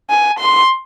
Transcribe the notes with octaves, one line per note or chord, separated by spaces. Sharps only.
G#5
C6